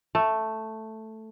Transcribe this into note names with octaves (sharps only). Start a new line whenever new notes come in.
A3